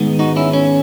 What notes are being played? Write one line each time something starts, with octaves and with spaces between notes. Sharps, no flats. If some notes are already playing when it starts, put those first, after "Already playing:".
Already playing: G#2 D#3 G#3 B3
D#4 F#4
C#4 E4
C#4